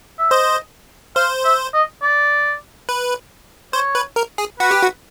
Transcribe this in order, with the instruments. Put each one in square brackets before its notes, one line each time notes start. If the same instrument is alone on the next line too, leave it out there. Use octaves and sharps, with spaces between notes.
[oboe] E5
[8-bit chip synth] C5 [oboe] D#5
[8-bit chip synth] C5 [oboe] F5
[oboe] E5
D#5
D5
[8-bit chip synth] B4
[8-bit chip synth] C5 [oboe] C#5
[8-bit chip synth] B4
A#4
G#4
[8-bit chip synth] F#4 [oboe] B4
[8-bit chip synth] G4
F#4